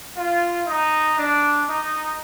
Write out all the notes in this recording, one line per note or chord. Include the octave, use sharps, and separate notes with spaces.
F4
D#4
D4
D#4